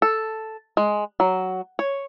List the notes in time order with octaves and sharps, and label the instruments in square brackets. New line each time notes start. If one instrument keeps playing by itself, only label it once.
[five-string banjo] A4
G#3
F#3
C#5